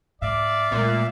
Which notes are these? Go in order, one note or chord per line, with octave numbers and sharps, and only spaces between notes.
G#2 D5 E5 F5
A#2 G#3 A3